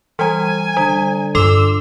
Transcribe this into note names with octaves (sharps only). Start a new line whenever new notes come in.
E3 G3 G#5
D3 G3
G2 F4 A4 C6 D6 E6